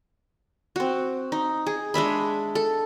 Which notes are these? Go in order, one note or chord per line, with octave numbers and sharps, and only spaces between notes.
C4 F#4
D#4
G#4
G#3 D4 E5 B5
A4